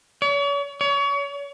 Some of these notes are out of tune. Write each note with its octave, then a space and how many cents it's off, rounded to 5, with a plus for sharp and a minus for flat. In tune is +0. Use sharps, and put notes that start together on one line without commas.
C#5 +40
C#5 +30